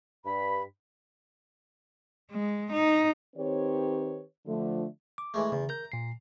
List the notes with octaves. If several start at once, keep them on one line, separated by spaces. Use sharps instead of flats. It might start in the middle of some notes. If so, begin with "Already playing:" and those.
G2 B5
G#3
D#4
D#3 C4 G4 B4 C#5
D3 F3 A3
D6
E3 G#3 A3
E2 C#3
A#4 A#5 G6
A#2 C7